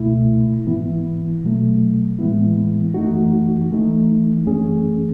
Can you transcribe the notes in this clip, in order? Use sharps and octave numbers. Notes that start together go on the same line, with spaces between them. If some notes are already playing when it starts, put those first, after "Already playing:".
Already playing: C#2 B2 A3 E4
G#2 E3 B3 E4
B2 F#3 A3
A2 E3 G#3 B3 E4
F#2 E3 A3 D#4 F#4
E3 A3 D#4
F#2 E3 A3 C#4 G#4